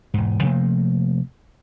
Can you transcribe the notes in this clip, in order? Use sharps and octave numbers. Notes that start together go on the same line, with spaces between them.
E1 G#2
C3 F3 A3 A#3